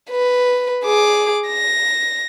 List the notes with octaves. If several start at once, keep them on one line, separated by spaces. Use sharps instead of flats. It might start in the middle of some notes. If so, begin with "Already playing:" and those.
B4
G#4 D6
A#6